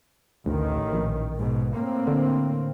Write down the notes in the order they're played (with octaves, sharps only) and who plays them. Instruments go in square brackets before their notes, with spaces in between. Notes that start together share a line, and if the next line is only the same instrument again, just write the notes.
[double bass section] A1 D#3 [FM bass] D2
[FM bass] A#1
[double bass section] G#2 B2
A2 A#3 C4
[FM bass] D3